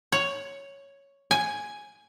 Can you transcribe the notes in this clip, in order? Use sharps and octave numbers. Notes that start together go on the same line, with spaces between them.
C#5
G#5